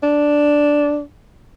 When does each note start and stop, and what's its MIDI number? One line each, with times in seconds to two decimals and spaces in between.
0.03 1.02 62